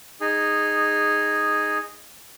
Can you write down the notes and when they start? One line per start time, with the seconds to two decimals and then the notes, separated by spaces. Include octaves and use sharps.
0.21 D#4 G#4